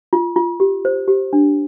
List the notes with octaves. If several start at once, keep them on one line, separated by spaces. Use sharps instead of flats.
F4
F4
G4
C5
G4
D4